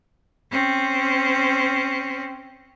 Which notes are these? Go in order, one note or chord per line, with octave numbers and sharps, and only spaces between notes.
C4 C#4